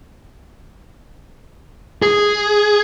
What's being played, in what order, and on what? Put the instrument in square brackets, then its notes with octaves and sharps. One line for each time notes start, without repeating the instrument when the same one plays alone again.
[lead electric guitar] G#4